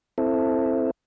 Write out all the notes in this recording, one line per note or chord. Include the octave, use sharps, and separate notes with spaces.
C4 E4 A4